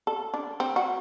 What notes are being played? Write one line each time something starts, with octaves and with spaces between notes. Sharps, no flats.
A4
D4
C4
F#4